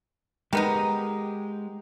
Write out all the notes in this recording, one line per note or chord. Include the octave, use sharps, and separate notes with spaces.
D#3 G#3 B3 D#4 G4